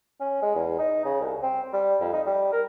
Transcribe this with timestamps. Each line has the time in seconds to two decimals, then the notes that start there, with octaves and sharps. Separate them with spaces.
0.21 C#4
0.42 G#3
0.55 E2
0.79 D#4
1.05 C#3
1.21 C2
1.42 C4
1.73 G3
2.00 F2
2.13 D#4
2.26 G3
2.53 A#4